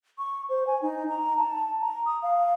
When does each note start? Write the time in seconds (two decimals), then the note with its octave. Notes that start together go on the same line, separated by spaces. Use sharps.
0.18 C#6
0.49 C5
0.67 G#5
0.82 D#4
1.09 A#5
1.37 A5
1.81 A#5
2.06 D#6
2.23 F5